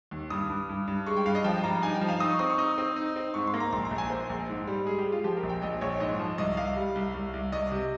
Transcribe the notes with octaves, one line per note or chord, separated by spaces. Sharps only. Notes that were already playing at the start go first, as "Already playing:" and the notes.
D#2
G2 D#6
G2
G2
G2
G#3 C#6
G5
G2 F5
D#5
F3 G5
G2 A#5
D#4 G#5
G5
F3
F5
D#4 D#6
C#6
C4 D#6
C#6
D#4 D#6
C4
D#4
C4
G#2 C#6
C6
A#3
A#5
A#1 C6
A#5
A#1
G#5
A#3 C5
A#1
G#2
G3
G#3 G#4
G4
G#3
F4
F3 G4
A#4
A#1
G5
A#1 D#5
A#1 C#5
G#2 D#5
F3
C2 D#5
C2 F5
G3
C2
C2
C2
C2 D#5
C3